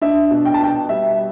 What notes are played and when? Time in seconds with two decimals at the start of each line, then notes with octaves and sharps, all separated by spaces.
0.02 D4 E5
0.31 B2
0.45 G5
0.54 A5
0.60 B2 G5
0.89 G3 E5